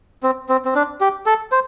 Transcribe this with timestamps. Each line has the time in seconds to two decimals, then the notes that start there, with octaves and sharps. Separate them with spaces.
0.23 C4
0.49 C4
0.65 C4
0.75 D4
1.01 G4
1.26 A4
1.52 C5